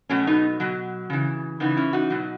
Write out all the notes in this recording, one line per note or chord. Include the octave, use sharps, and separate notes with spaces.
B2 F#3 A3 C#4
B3 D#4
B2 F#3
C#3 E3
C#3 E3 B3 D#4
C#4 E4
D#4 F#4
B2 F#3